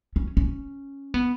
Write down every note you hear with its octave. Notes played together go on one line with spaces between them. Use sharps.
C#4
C#4
B3